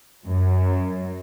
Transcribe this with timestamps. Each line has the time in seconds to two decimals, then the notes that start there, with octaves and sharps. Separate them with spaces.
0.25 F#2 F#3